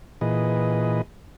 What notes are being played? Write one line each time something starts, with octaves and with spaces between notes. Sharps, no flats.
A#2 E3 G#4 B4 D#5